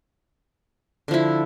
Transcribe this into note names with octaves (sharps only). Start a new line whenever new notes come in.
D3 F3 E4